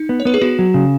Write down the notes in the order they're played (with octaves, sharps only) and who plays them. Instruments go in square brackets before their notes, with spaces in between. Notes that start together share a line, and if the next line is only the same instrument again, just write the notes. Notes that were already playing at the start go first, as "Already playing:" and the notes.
Already playing: [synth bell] D#4
[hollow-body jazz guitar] B3
[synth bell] C#5
[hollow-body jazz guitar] B3 [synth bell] B4
[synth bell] G#4
[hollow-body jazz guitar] B3 [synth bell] F#4
[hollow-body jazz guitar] F#3
C#3